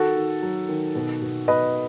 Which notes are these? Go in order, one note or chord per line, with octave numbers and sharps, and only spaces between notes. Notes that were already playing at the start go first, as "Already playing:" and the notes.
Already playing: D#3 F#4 A4
D#3
F#3
D#3
B2
B2
B2 B4 D#5